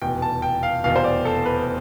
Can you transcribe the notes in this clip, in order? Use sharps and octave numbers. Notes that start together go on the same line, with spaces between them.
F1 E2 B2 G5
A5
G5
F5
F1 E2 B2 F5
C5
D5
A4
B4